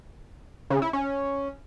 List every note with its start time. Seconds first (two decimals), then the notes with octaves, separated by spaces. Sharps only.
0.70 C#3
0.82 E4
0.93 C#4